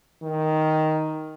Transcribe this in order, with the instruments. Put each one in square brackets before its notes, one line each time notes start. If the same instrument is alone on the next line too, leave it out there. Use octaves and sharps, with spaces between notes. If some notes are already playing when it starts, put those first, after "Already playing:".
[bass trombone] D#3